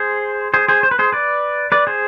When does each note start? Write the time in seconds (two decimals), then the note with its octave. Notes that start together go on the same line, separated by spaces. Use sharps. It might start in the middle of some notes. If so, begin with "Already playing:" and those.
Already playing: G#4 C5
0.54 G#4 C5
0.68 G#4 C5
0.83 C5
0.91 B4
0.99 G#4 C5
1.12 B4 D5
1.72 B4 D5
1.87 G#4 C5